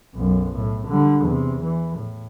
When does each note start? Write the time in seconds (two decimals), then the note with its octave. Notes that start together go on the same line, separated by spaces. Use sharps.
0.15 B1 F#2
0.56 A2
0.88 D3 G3
1.25 E2 C3
1.64 E3
1.98 A2